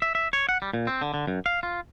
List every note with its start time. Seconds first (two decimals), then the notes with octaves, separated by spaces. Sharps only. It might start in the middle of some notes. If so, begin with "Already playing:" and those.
0.02 E5
0.15 E5
0.33 C#5
0.49 F#5
0.62 G3
0.73 A#2
0.87 C4
1.01 D3
1.14 D3
1.27 F#2
1.46 F5
1.63 F4